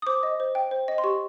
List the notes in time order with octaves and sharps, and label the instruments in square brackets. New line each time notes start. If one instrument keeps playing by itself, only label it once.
[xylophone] D#6
C5 D6
D#5
C5
G5
C5
D#5
C6
G4 C#6